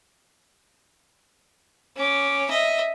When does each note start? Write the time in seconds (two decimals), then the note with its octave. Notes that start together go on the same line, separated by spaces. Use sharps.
1.97 C#4 D6
2.50 D#5 E5